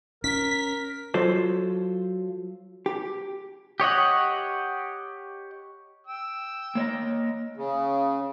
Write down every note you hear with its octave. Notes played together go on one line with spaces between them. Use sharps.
C#4 A#4 B6
F#3 F4 A4 C5
G4
G4 C#5 D#5 F#5
G5 E6
A#3 C#5 D#5
C#3